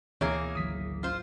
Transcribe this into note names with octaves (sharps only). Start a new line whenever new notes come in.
D2 B2 E3 A#3 G#4 C#5
G#1 D2 F#3 D#6 B6
F4 C5